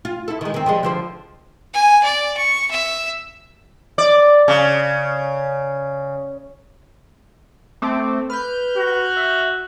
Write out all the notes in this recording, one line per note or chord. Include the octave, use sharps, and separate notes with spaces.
F4
E4 A4
D#3 G#3
D#3 C4
F3 G3 G#3
D3 F3 C5
G#5
D5
C#6
E5
D5
C#3
A3 C4 D6
B4 F6 G6
F#4
E5